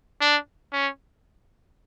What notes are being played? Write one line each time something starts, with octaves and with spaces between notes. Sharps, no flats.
D4
C#4